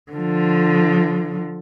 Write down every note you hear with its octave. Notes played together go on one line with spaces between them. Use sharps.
D3 F3